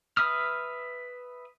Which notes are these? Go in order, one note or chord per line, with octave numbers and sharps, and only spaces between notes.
B4 E5 D#6 F6